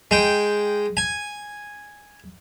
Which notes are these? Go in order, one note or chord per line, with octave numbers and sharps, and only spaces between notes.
G#3 G5
G#5